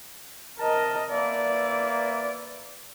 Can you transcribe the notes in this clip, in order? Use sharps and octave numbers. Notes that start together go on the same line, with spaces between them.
C3 A#4 D#5 A5
A#3 B4 D5 E5